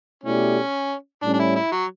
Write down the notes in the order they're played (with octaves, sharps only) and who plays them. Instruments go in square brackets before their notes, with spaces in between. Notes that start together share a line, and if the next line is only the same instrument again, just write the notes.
[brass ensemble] B2 A3 E4 G4 D5 [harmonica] C#4
[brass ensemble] A2 G3 C#4 [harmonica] D4
[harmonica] D4
E4
E4
F#3